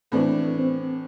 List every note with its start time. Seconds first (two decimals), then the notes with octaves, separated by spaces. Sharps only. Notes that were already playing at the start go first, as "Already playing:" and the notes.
0.12 A2 E3 A3 C4 D4
0.57 C4